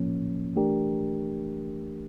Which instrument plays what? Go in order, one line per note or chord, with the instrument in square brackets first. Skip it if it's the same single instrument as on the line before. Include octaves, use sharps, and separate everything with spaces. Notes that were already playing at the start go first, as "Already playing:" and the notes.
Already playing: [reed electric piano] A2 F3 A#3 C#4
E3 A3 D4 G4 A#4